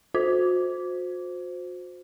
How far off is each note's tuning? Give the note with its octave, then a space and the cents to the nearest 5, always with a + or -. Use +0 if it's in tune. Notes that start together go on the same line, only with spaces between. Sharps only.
F#4 -40 C5 -10